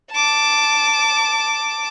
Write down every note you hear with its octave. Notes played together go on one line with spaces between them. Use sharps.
A5 D6